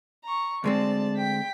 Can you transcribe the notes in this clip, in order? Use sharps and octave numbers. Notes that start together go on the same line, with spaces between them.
A#5 C#6
D2 G#3 C4 D5 A5
G5 B6